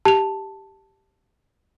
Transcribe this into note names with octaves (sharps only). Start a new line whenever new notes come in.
G4 A5 F7